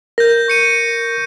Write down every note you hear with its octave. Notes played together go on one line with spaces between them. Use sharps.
A#4 G6 A#6
C#6 C#7 D#7